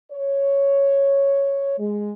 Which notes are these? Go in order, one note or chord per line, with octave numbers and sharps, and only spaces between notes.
C#5
G#3